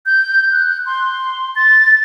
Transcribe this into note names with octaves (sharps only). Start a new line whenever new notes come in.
G6
F#6
C6
A6